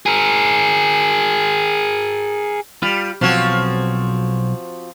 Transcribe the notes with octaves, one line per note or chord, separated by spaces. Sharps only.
G#4 A#4
G3 F4
B1 F3 C4 F#4 C#5